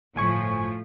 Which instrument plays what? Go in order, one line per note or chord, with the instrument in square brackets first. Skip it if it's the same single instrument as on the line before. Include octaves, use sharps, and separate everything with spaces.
[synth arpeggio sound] G1 G#5 C#6 [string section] A2 F3